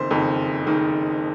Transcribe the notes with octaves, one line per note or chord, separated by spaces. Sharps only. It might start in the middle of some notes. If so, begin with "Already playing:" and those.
Already playing: F#1 F2 D#3 C5
F#1 F2 D#3
F#1 F2 D#3